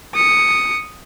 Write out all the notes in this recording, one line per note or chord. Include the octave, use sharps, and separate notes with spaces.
D#6 C#7